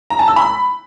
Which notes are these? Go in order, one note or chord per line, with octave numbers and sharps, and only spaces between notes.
A#5
A5
E6
B5